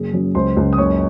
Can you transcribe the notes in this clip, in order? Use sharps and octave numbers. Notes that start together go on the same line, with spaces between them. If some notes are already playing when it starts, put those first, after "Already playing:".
Already playing: F#1 G#4
F#2
C#2 C5 C6
C#2
D#6
F#1 C#5 C#6